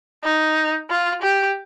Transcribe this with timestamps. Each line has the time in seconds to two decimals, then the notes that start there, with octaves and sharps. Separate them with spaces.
0.24 D#4
0.90 F4
1.22 G4